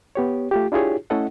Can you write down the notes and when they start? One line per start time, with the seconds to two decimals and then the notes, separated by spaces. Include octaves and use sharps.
0.15 B3 G4 C#5
0.51 A3 F4 G4
0.72 D4 E4 F4 G4 G#4 C#5
1.10 A3 C#4 E4 A4 D#5 F#5